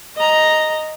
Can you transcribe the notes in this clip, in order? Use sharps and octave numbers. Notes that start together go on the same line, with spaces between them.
D#5 A#5